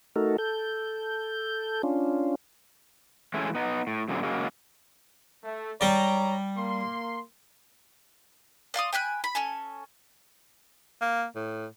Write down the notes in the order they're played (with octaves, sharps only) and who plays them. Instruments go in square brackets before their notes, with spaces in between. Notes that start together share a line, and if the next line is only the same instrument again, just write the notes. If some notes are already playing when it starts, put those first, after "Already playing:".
[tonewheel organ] A3 D#4 F#4 A4 A#4
A4 G6
C#4 D4 F4
[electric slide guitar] E3 G#3 A3 C#4 E4
B3 D#4
A2
F#2 A#2 D3 G3 C4 G#4
C#3 F#3 G#3 A#3
[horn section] A3
[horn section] G#2 C#5 A#5 [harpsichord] G3 D5
[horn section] A#3 C6
[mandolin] D5 F5 C6 D#6
G5 G#5 B5 F#6
B5
C#4 A4 G#5
[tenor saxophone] A#3
A2